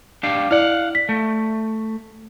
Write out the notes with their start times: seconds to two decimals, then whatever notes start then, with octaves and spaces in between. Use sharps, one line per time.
0.23 D4 G4 F5
0.51 E4 D5 F5 F#5
0.95 B6
1.09 A3